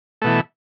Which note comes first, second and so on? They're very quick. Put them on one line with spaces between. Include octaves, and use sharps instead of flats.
A3 B2 E3